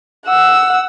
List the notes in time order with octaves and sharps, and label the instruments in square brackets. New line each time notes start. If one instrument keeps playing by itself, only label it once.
[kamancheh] F#5 E6